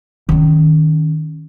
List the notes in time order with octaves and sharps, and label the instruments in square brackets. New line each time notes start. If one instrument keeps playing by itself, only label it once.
[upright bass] D#3 C#4